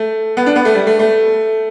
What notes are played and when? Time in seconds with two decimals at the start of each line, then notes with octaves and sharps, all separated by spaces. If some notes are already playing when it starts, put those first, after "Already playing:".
Already playing: A3
0.37 B3
0.46 D4
0.56 B3
0.65 A3
0.75 G3
0.87 A3
0.99 A3